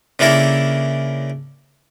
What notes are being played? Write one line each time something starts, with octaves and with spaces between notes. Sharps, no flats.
C#3 A#3 D4 E4 A4 A#4